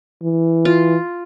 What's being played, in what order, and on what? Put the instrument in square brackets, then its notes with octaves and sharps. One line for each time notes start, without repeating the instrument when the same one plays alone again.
[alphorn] E3
[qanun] F4